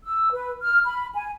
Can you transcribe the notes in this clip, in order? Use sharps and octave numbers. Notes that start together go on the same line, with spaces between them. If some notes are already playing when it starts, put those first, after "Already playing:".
E6
B4
F6
B5
G#5